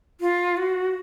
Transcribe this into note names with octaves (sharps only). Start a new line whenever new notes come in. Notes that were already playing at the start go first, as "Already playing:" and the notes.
F4
F#4